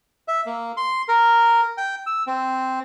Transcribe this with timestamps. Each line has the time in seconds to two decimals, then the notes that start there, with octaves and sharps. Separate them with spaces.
0.28 E5
0.46 A#3
0.77 C6
1.08 A#4
1.78 G5
2.07 E6
2.27 C4